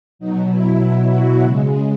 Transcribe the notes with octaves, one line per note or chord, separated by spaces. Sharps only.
B2 F#3 D#4
E4
F#4
C#3 G#3